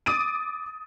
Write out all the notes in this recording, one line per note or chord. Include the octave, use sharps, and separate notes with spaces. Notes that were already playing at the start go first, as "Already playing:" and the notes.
D6 D#6 A6 D7 D#7